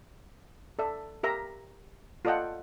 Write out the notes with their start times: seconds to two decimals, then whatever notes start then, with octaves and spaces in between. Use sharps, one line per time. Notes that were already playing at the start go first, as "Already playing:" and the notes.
0.79 A4 D5 E5
1.23 G4 A#4 E5 A#5
2.25 F4 A4 D5 D#5 F#5 G5